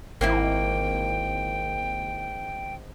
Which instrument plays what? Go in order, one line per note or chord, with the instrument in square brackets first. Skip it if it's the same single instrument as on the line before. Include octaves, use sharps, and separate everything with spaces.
[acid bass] G#1 [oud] A#3 C4 E4 [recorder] G5